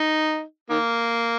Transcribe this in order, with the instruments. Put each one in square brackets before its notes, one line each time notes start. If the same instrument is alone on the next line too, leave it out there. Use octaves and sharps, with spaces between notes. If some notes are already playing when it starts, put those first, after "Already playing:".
Already playing: [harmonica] D#4
D#3 A#3